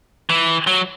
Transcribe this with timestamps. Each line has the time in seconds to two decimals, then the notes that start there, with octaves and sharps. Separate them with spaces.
0.30 E3
0.67 F#3